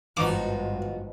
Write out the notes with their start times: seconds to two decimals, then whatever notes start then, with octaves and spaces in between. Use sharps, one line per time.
0.17 G#1 G2 B2 F3 D#4 F4 F#4 D6